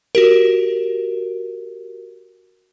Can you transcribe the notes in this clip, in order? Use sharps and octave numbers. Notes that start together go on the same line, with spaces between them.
F#4 G4 A#4